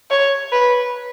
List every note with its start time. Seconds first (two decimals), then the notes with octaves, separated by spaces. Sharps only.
0.11 C#5
0.52 B4